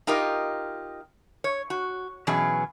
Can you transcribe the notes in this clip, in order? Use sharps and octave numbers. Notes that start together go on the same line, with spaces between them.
D#4 F4 G4 A#4 D#5
C#5
F#4
B2 E3 F#3 C#4 G#4